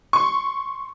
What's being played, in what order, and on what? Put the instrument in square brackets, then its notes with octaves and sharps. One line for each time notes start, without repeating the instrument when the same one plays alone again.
[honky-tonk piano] C6 C#6